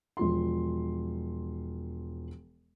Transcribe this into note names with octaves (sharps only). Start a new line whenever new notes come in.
E1 F3 C6